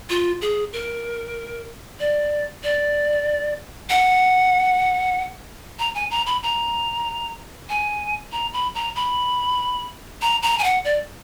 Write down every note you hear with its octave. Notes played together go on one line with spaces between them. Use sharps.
F4
G#4
A#4
D5
D5
F#5
A#5
G#5
A#5
B5
A#5
G#5
A#5
B5
A#5
B5
A#5
A#5
G#5
F#5
D5